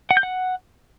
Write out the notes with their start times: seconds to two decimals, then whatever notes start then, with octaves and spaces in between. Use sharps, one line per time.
0.11 F#5
0.17 G6
0.23 F#5